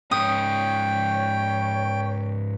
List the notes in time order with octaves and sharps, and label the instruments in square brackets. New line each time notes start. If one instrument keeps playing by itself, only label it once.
[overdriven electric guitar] G#2 C#4 [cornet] C#5 [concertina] G5 [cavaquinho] D#6